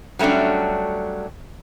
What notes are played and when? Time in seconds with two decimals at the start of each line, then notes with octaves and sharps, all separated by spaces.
0.19 F#3 G3 A3 C#4 D4